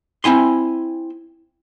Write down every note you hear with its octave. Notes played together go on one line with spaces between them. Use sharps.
C4 E4 G#5 C6